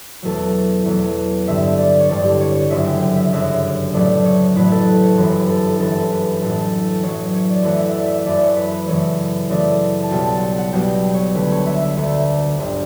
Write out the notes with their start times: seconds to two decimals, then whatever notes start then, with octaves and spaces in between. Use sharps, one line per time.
0.22 E2 B2 F#3 A3 A4
0.85 E2 B2 F#3 A3
1.47 A1 G2 D3 G3 E5
1.78 D5
2.00 C#5
2.09 A1 G2 D3 G3 D5
2.25 G4
2.40 C#5
2.55 C#5
2.70 G1 F#2 C#3 F#3 E5
2.87 G5
3.02 G5
3.17 E5
3.32 G1 F#2 C#3 F#3 E5
3.93 A1 A2 F#3 A3 D5
4.24 C#5
4.56 A1 A2 F#3 A3 B4
4.71 A4
4.87 B4
5.03 C#5
5.17 G1 F#2 E3 B4
5.49 A4
5.79 G1 F#2 E3 A4
6.11 B4
6.41 A1 A2 F#3 A4
6.61 A4
7.02 A1 A2 F#3 C#5
7.34 C#5
7.50 D5
7.63 F#2 E3 A3 F#5
7.79 E5
7.93 D5
8.06 E5
8.26 F#2 E3 A3 D5
8.42 C#5
8.57 B4
8.72 B4
8.87 F#2 C#3 E3 A3 C#5
9.50 F#2 C#3 E3 A3 D5
10.03 A5
10.11 B1 B2 G3 G5
10.27 A5
10.37 F#5
10.43 G5
10.58 F#5
10.73 B1 B2 G3 G5
10.94 G5
11.14 C#5
11.35 D2 D3 A3 B4
11.51 C#5
11.66 E5
11.81 E5
11.97 D2 D3 A3
12.58 G1 G2 D3